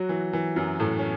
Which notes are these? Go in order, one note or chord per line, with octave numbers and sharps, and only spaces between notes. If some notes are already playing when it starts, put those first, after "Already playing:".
Already playing: F#3 F#4
E3
E3
F#2 F#3
A2 A3
C#4